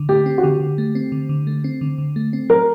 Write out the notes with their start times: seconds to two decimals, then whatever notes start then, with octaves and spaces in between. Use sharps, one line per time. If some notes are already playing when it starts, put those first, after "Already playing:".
Already playing: D3
0.09 A3 G4
0.26 C4
0.38 F#4
0.43 D3 G4
0.60 D3
0.78 A3
0.95 C4
1.12 D3
1.29 D3
1.47 A3
1.64 C4
1.81 D3
1.98 D3
2.16 A3
2.33 C4
2.49 F#3 A#4